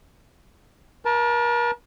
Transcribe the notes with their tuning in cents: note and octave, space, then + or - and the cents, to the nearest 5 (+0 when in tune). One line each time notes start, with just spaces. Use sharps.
A#4 +40 A5 +0